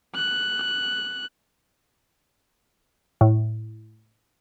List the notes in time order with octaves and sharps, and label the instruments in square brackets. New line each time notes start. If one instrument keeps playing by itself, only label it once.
[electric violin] F#6
[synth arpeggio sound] A2